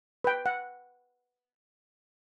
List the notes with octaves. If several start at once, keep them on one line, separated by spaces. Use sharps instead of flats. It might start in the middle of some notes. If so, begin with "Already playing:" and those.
B4 G5
F#5